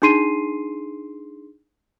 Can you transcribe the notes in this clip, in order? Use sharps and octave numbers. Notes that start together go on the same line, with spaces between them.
D4 D#4 G#4 C6 C7 D#7